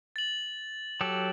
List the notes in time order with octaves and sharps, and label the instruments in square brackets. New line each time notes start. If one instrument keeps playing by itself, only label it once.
[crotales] A6 F#7
[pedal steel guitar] F#3 G4 A4